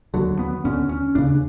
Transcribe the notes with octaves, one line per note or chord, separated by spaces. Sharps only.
D#2 D3 F#3
B3
D#2 D3 C#4
C#4
D#2 C#3 D4